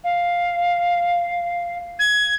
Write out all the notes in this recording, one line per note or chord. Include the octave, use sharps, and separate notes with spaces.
F5
G#6